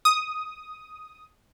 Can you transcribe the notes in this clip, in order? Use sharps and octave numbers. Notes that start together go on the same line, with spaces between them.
D#6